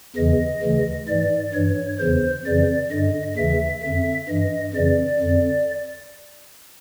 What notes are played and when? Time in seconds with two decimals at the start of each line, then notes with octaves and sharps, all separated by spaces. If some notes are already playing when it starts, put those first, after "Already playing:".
0.16 E2 C#3 E3 D#5
0.63 D2 C#3 E3
1.07 G#2 E3 D5
1.54 G2 E3 C#5
1.99 E2 C#3 E3 C5
2.45 F2 C#3 E3 D5
2.90 G2 D3 D#5
3.37 D#2 C#3 E3 E5
3.82 F2 D3 E5
4.28 G2 E3 D#5
4.74 F2 C#3 E3 D5
5.20 F2 D3